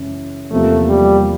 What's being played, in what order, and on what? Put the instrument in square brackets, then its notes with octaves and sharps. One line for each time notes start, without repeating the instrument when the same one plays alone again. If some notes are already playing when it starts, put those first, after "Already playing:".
Already playing: [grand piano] F#2 C#3 E3 G#3
[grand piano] E2 C3 F3 A#3 [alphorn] A3
[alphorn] G3